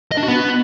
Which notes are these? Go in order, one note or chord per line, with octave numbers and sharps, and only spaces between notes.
D#5
D4
F#4
B3